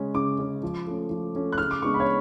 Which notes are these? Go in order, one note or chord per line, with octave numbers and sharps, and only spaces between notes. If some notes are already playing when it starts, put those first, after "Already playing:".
Already playing: C#3 G#3 C#4
C#3 D6
G#3 C#4
F3
A3 C#4
F3
A3 C#4
F#6
C#3 F6
D6
G#3 B3 D4 C#6
B5
C#5